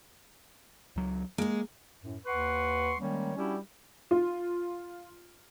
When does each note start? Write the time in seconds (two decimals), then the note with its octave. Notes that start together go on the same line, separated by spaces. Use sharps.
0.96 C#2 F#3
1.38 G#3 A#3 G#4
2.03 F#2 A2
2.26 D#2 B4 F#5 C6 C#6
3.00 D#3 G3 G#3 A#3 C#4 C#5
3.36 G3 C#4 D4 E4 F#4 G4
4.11 F4